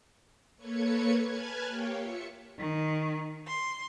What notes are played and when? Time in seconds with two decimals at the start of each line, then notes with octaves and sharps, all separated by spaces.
0.56 A#3 A4 B4 C#5 G#6 C#7
1.25 B4 G#5 A5 F6 F#6 G#6
1.67 A#3 G4 C#5 F5 G5
1.97 F4 E5 C#7
2.59 D#3
3.46 C6